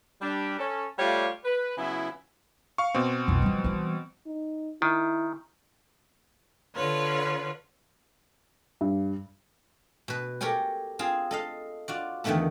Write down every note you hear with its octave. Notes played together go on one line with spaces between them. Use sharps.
G3 D4 G4
C#4 A4
G3 A3 F4 C#5 D5 F5
B4
C#3 F#3 B3 E4
F5 C#6
B2 C4
B1 F2
F3 G3
E3 G3
D#4
D#3 E4
D3 F4 B4 C#5
G2
B2 B4
G4 A4 A#4 C#5 G5 G#5
C4 F4 G#4
A4 D#5 F5
F4 F#4 D5
E2 D3 D#3 A3 B3 A4